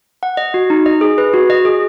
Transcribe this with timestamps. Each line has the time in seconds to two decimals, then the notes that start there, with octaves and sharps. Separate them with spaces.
0.23 F#5
0.37 D#5
0.54 F#4
0.70 D#4
0.86 D#5
1.01 G#4
1.18 B4
1.34 F#4
1.50 D#5
1.65 G#4